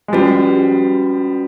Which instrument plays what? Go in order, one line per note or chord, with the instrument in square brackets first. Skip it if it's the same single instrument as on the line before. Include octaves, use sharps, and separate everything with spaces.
[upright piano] G#3
[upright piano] F3 G3 [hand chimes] C#4 F#4 B4